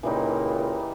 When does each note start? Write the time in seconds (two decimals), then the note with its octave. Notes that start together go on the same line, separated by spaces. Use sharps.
0.03 C#2 A#2 E3 G3 D#4